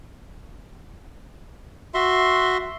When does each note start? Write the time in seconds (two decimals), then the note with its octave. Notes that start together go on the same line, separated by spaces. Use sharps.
1.94 F#4 E5 C6